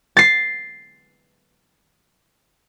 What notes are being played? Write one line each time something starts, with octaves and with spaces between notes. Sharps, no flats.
A6 C7